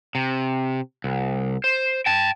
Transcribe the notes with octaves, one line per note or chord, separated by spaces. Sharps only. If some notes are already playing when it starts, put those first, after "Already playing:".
C3
C2
C5
G5 A5